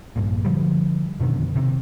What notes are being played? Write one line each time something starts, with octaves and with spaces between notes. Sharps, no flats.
A#1 G2 A#2
D3 F3 G3
F2 B2 D3 D#3
C3 D#3